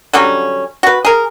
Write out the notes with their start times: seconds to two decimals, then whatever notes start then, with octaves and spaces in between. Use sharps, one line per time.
0.13 D3 F#3 G3 C#4
0.83 F#4 B4
1.05 G#4 A#4